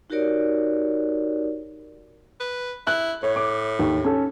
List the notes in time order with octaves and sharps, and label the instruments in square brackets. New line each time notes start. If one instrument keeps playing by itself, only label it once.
[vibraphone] D#4 F#4 G4 A#4 C#5 D5
[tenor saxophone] B4
[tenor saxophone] E4 [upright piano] F#6
[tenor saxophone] A2 [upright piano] C#5
[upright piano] D6
D#2
C#4 A4